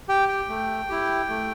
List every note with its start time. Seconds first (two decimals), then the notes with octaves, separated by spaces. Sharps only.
0.09 G4 G5
0.28 G5
0.49 A3
0.89 E4 G4
1.29 A3